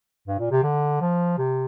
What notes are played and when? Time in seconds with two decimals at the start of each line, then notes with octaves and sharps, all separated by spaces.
0.28 G2
0.39 A#2
0.51 C3
0.63 D3
1.01 F3
1.38 C3